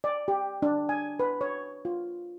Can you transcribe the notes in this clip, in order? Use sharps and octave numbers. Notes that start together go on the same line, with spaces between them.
D5
G4
D4
G#5
B4
C#5
F4